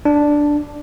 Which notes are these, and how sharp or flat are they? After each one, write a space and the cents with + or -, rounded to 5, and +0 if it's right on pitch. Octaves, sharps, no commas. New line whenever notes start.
D4 +0